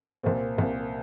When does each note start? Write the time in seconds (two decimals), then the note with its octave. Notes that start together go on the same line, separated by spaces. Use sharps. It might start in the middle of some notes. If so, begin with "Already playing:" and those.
0.23 C2 A#2 C4
0.58 C2 A#2